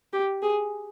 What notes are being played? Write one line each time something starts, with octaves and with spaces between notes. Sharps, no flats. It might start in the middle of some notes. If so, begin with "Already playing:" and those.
G4
G#4